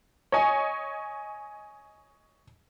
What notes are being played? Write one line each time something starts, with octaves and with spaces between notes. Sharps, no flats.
C#5 D#5 G#5